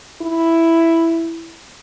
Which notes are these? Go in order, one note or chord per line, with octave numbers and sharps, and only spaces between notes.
E4